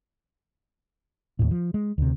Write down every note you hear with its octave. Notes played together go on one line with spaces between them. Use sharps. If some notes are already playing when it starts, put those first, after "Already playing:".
D#2 A2
F3
G#3
D2 C3